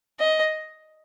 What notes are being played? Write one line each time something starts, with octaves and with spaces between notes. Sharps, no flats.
D#5